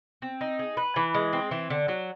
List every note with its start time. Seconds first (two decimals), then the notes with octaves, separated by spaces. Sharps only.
0.22 C4
0.41 D#4
0.59 G#4
0.77 B4
0.96 E3
1.14 G#3
1.33 C4
1.51 E3
1.70 D3
1.88 F#3